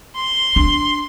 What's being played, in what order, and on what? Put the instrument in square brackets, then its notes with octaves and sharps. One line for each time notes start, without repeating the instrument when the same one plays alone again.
[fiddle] C6
[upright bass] D4